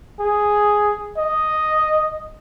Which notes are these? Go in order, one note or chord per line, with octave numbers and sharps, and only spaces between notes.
G#4
D#5